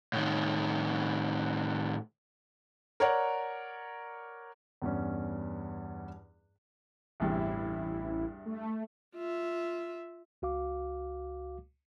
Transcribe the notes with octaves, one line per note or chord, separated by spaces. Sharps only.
A2 D#3
A#4 C#5 D5 F#5
E2 G2 C#4
A1 E2 G2 C3 E4
A3
F4 E5
C#2 F#4 F5 D6